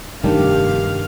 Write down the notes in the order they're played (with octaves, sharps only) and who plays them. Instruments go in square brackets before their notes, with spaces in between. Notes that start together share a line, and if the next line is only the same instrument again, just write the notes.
[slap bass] F1 G3 A3 [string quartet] G2 F5 [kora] D#3 D4 [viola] G4